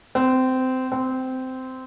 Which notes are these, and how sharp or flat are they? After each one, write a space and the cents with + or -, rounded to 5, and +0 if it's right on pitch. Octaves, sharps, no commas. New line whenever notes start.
C4 -20
C4 -15